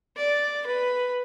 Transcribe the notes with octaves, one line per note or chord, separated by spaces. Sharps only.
D5
B4